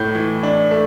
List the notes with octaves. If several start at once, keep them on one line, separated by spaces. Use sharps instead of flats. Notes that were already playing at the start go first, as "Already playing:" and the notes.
Already playing: A2 A3 G6
E3
D4
A3